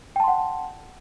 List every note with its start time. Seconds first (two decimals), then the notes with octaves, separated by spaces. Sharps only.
0.16 G5
0.20 A5
0.24 C6
0.28 F#5